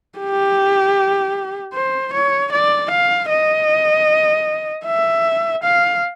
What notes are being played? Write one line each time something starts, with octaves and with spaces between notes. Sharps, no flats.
G4
C5
C#5
D5
F5
D#5
E5
F5